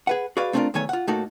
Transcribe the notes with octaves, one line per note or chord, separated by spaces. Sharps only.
G#4 B4 F#5
F#4 G#4 B4 D5 F5
A3 C4 D4 D#4 F4 A#4
B1 E2 D#3 A3 C#5 G#5
F4 F#5
A2 A3 A#3 D#4 F#4 A4